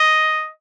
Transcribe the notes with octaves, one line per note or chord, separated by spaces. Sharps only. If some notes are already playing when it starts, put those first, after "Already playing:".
Already playing: D#5